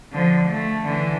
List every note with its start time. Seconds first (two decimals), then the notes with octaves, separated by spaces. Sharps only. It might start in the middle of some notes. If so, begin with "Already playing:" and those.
0.12 D3 F3
0.48 A3
0.84 D3 E3